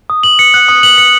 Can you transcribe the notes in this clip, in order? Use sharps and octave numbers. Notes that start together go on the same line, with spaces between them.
D#6
F#7
C#7
F#6
D#6
F#7
C#7